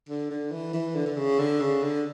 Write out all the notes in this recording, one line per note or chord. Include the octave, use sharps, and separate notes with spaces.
D3
D3
E3
E3
D3
D3
C#3
D3
C#3
D3